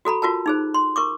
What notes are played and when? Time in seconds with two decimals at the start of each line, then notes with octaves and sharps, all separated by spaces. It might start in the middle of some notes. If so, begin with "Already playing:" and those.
0.05 F#4 A4 A#5 B5
0.22 F4 F#4 A#4 A5
0.46 D#4 G#4 C5
0.74 C6
0.96 A#4 C#6 D6